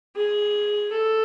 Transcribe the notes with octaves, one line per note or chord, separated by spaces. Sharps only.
G#4
A4